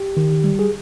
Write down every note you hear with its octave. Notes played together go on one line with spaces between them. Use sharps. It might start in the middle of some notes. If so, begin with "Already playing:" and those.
Already playing: G4
D#3
G3
G#4